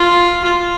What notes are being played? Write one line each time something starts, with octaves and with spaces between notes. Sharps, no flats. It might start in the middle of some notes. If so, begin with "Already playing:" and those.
Already playing: F4
F4